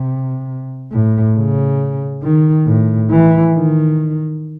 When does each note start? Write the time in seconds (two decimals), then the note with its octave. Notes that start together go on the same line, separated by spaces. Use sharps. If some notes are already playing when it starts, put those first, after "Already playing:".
Already playing: C3
0.92 A2
1.36 C#3
2.23 D#3
2.66 A2
3.10 E3
3.54 D#3